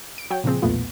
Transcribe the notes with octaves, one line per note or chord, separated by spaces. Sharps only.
D7
F#3 C#5 G5
A#2 C#3 F3 C4 G#4
B1 E2 A#2 A3 B3 F4